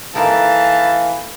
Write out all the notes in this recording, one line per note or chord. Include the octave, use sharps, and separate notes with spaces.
E3 A#3 D#4 A4 F5 A5